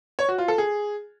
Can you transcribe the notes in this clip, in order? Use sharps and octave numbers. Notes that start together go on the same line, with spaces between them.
C#5
F#4
F4
A4
G#4